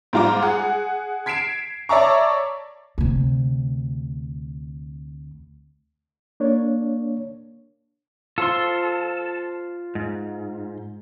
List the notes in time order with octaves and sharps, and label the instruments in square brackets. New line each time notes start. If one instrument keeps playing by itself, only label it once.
[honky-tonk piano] G#2 G3 F4 A#5 D6
G#4 F#5
G#6 B6 C7 D7 E7
C#5 D5 E5 A5 A#5 C#6
[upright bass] D2 C3
[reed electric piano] A#3 D4 C#5
[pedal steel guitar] F4 C5 C6 [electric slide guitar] A4
[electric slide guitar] G#2